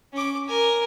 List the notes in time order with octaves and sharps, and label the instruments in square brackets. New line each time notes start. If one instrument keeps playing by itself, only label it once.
[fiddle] C#4 D6
A#4 G#5